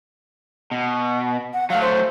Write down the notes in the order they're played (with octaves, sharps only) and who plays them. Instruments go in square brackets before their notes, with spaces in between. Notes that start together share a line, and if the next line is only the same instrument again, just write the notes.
[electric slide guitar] B2
[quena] F#5
[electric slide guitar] F#3 A3 [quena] F5
[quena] C5